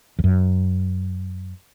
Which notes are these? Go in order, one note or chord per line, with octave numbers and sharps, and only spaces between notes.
E2
F#2